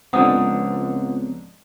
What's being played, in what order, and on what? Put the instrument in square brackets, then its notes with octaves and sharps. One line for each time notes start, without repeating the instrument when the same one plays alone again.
[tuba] C#2 [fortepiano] G#2 D3 [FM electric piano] F3 B3 C4 [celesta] F#5 D#6